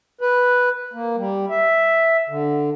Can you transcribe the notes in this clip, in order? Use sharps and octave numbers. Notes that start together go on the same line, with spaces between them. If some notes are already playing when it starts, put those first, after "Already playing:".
B4
A#3
G3
E5
D3